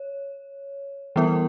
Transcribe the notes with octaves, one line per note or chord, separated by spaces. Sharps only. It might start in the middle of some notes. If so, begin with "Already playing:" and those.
Already playing: C#5
E3 G3 B3 E4 A#4